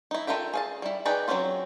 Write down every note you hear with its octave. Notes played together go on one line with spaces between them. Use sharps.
D#4 E4
F4 A4 A#4 E5 G5
G#4 F5 A5
G3 E4
D#4 G4 G#4 B4 D5
F#3 G#3 C4 C#4 F4